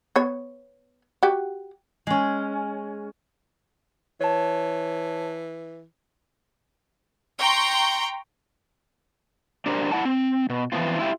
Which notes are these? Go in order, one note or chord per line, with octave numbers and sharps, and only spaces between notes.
B3 C#5
F#4 G4
G#3 C#4
E3 C#5 A5
G5 A#5 C6 C#6 G6
D4 G4 A#4 C5
E4 F#5 A5
C4
B2
E3 F3 B3 C4 F4
E4 F4 G4 E5